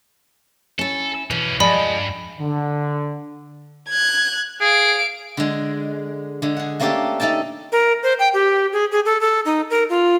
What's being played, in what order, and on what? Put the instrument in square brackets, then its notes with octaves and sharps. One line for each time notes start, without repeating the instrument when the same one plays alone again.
[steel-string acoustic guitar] C#4 E4 [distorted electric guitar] A4
[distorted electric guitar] B2 C#4 [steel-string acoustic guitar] E3
[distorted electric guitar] G2 [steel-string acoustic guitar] F3 G#3 D#5 [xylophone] D5 B5
[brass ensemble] D3
[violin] F#6 G#6
[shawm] G#4 [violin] F5 D7
[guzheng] D3 G#3
D3 G#3
G#4 F#5
A3 A#3 C#4 D4 G4 A4
A3 D#4 A4 G5 A5
[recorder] A#4
C5
G5
G4
G#4
G#4
A4
A4
D#4
A#4
F4